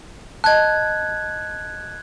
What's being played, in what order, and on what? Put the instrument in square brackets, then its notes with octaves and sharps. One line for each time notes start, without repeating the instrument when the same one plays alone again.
[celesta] D#5 A5 [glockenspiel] F#6 G#6